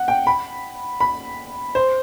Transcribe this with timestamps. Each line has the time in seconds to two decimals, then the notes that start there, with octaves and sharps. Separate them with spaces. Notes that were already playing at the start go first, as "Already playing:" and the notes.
Already playing: F#5
0.08 G5
0.27 B5
1.00 B5
1.75 C5